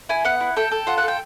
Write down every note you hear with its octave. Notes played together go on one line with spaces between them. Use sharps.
E4 G#5
B3 F#5
E4
A4 G5
A4
F4 F#5
F#5
A4
G5